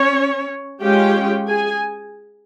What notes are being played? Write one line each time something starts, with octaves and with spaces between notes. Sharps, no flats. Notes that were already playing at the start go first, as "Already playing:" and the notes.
Already playing: C#4 C#5
G#3 C#4 F4 G4 G5
G#4 G#5